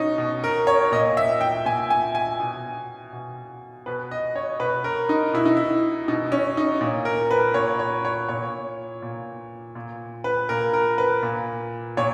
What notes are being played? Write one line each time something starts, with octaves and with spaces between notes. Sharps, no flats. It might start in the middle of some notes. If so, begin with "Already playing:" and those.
Already playing: B2 C#4 D#4
B2
A#4
C#5
A#2 D#5
E5
G5
A#2 G#5
G#5
G#5
B2
B2
B2 B4
D#5
C#5
B2 B4
A#4
D#4
B2 E4
D#4
E4
B2 D#4
C#4
D#4
A#2
A#4
B4
A#2 C#5
C#5
C#5
A#2 C#5
A#2
A#2
B4
A#2 A#4
A#4
B4
A#2
A#2 C#5